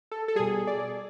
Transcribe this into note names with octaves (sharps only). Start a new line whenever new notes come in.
A4
A4
B2 G3 G#4
D5